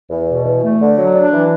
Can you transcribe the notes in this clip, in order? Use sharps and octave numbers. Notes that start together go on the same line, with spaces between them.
E2
B2
E2
A3
D3
F#3
D4
E3